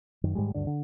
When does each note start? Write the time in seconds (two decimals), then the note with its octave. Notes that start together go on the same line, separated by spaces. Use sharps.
0.23 F#2 D#3
0.35 G#2 D#3 G3 G#3
0.54 D2 G2 D3 D4
0.67 D3